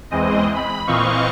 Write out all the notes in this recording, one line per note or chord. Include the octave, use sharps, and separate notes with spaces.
E2 E3 G#3 C4 D#5
B5
A#2 E3 C4 D#5 F5 C#6